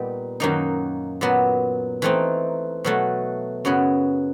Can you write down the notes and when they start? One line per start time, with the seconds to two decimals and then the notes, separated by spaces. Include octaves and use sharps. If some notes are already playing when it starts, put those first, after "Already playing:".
Already playing: A#2 G3 B3 D#4
0.40 F#2 D#3 F#3 A#3 D#4
1.21 A#2 F#3 B3
2.02 E3 A3 C4 D#4
2.84 B2 F#3 A3
3.65 F#2 C#3 F#3 B3